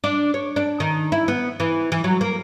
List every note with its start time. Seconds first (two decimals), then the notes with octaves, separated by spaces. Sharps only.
0.04 D4
0.34 C#5
0.56 D4
0.80 D#3
1.12 E4
1.28 B3
1.60 E3
1.92 E3
2.04 F#3
2.21 A#3